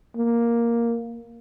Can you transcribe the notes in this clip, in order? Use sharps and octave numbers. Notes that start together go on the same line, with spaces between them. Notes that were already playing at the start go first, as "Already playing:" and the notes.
A#3